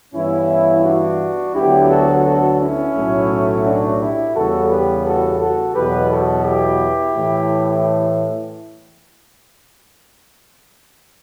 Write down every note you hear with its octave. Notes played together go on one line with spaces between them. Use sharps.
G2 E3 B3 C#4 E4
D4 F#4
D2 D3 F#3 B3 E4 G4
F#4 A4
F#4 A4
C#4 E4
B1 A2 F#3 A3
D4 F#4
E4 G4
E2 C#3 G3 B3 F#4 A4
G4 B4
F#4 A4
F#4 A4
E2 B2 F#3 B3 G4 B4
F#4 A4
E4 G4
A2 E3 A3